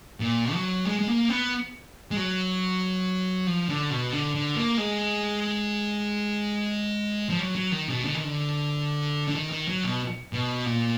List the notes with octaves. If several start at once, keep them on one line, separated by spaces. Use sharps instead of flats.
A#2
F#3
G#3
G#3
A#3
B3
G#3
F#3
F3
D3
B2
D3
D3
A#3
G#3
F3
F#3
F#3
D#3
B2
D3
D#3
D3
D3
D#3
D#3
F#3
B2
B2
A#2